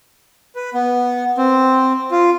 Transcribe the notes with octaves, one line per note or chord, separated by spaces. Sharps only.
B4
B3
C4
F4